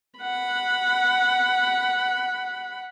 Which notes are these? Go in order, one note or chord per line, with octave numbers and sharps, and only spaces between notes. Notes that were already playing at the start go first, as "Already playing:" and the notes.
F#5 B5